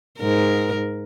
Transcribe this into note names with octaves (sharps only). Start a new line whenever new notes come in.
G#2 A#4